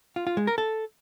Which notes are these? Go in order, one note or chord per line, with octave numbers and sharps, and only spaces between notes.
F4
F4
G#3
A#4
A4